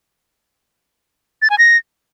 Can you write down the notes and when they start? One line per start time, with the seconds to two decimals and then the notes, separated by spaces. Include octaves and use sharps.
1.42 A6
1.50 G#5
1.58 A#6